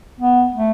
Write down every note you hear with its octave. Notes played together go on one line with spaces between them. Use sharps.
B3
A3